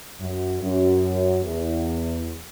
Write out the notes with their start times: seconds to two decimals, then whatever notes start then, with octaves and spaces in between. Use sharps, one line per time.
0.20 F#2
0.61 F#2
1.45 E2